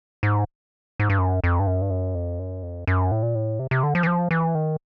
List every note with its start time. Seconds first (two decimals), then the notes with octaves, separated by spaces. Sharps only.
0.23 G#2
1.00 G#2
1.10 G2
1.19 F#2
1.44 F2
1.60 G2
1.67 F#2
1.82 G2
1.90 F#2
2.15 F2
2.39 F#2
2.63 F2
2.87 F#2
3.11 A2
3.23 A#2
3.35 A2
3.59 C3
3.71 C3
3.83 D3
3.95 F3
4.03 E3
4.07 F3
4.31 E3
4.55 D#3